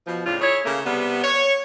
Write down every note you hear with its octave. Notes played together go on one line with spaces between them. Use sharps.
B2 F3
A2 C#3 D4 F4
E4 G#4 C#5
C#3 A3 A#3
C3 G3 B3
C#5